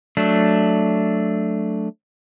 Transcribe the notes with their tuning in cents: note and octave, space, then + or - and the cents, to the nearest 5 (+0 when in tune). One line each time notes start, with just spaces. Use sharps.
F#3 +0 A3 +0 D4 +0